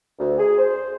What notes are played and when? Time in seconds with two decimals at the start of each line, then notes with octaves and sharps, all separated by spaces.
0.19 D2
0.38 G#4
0.58 C5